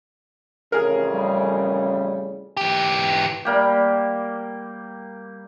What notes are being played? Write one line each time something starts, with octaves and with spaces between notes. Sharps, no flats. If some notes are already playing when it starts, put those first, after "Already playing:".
A1 F2 C#3 G#4 A#4
G3
E3 G4
G3 A#3 G4